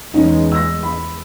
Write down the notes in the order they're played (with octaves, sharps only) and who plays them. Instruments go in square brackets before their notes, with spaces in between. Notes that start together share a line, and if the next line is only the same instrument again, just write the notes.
[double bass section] E2 G#3 [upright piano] C#4 D#4
[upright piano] E6 A#6
B5